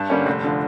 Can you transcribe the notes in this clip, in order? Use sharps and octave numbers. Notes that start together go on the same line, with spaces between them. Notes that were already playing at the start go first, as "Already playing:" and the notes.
Already playing: G2 A5
D3 G3 A#3 C#4
F1
D3 F3